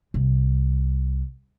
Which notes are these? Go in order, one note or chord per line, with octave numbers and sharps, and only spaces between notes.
C2